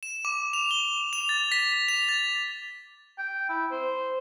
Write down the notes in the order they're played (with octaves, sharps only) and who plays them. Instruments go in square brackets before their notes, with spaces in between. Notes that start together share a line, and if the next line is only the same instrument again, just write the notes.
[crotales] E7
D6
F7
G7
F7
A6
B6
F7
A6
[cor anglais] G5
E4
C5